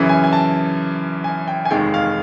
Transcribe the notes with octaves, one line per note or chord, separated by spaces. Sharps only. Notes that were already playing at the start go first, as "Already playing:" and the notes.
Already playing: F#2 C#3 E3
G#5
G#5
A5
G#5
G5
G#5
F1 D#2 D#3 G#3 G5
F5